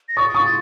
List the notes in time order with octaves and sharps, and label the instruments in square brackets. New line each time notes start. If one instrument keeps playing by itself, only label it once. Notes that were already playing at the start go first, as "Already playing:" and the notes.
[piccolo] A#6
[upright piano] C#6 D#6 [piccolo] A6
[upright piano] C#6 D#6